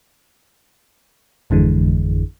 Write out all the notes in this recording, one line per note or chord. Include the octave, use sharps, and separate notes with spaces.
G#1 F2 D3 E3 G#3